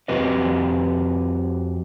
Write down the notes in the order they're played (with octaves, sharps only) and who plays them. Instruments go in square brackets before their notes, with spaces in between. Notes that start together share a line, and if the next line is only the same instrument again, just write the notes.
[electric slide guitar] F2 C4 F#4 G4 B4 D#5